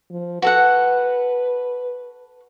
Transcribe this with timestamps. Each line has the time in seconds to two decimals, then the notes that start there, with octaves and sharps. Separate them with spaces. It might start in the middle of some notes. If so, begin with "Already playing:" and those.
0.11 F3
0.42 F#4 A4 B4 F#5